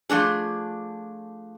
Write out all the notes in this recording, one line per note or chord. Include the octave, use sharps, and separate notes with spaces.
F3 A3 D4 G#4